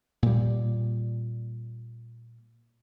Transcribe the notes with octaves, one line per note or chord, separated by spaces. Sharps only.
A#2 G3